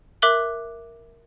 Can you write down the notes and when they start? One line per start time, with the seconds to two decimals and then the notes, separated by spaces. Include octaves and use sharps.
0.22 A#4 E5 D6 F#6 F#7 G7